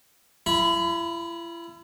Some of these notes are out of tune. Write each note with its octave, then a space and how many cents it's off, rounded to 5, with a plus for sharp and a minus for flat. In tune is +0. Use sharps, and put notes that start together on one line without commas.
E4 +40 B5 -20